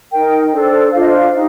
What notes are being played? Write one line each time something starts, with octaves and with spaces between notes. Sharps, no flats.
D#4 A#4 G5
D4 A4 C5
D4 F4 C5 F5
D#5
F5
D#4 G4